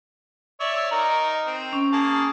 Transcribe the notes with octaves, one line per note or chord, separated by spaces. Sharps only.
C#5 D5 E5
D#4 A#4
C4
C#4
A#3 G#4 A5